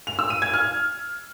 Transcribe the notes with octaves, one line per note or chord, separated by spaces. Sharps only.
F7
E6
D#7
G#6
F6